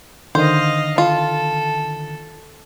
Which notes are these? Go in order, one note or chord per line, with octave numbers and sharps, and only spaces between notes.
D3 D#3 C5 D#5 F5
F4 A4